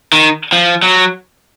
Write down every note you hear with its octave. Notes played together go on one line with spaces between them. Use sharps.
D#3
F3
F#3